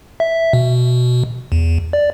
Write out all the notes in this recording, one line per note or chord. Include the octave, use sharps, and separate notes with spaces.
E5
B2
E2
D5